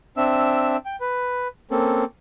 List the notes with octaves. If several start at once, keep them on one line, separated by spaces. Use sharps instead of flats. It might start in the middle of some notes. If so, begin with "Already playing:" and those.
C4 D4 E5 E6
G5
B4
A#3 C4 C#4 A4